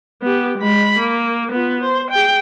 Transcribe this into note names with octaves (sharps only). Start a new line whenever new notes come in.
B3 G4
G#3 B5
A#3
B3 F4
C5
G#4 G5